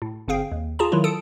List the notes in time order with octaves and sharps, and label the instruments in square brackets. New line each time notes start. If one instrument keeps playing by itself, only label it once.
[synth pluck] A2
G1 C4 G#4 F5 G5
D#2
F4 G#4 A5 A#5
D#3 F#3 E4 F4
A4 A5 D#6 C#7 D7